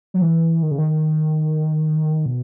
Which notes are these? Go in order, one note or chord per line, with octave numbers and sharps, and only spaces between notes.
F#3
E3
D#3
C#3
D#3
B2